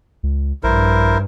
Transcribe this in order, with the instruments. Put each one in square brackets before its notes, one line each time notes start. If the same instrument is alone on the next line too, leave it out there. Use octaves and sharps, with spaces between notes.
[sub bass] C#2
[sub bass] A#1 [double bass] G2 [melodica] E4 A#4 C5